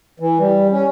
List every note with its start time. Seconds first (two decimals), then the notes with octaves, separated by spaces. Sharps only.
0.20 E3
0.39 G3
0.72 C#4